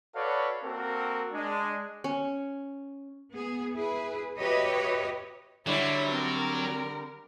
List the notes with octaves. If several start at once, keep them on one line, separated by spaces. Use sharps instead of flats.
F#4 A4 B4 C#5 D5 F5
A#3 C4 F#4 A4 A#4
G#3 D4
C#4
B3 G#4
E4 G#4 B4
F#4 G4 B4 C#5 D#5 E5
D3 F#3 G3 E4 C#5
C4 A#4